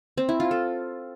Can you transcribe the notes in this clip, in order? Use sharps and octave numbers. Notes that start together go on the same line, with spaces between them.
C4
E4
F4
A4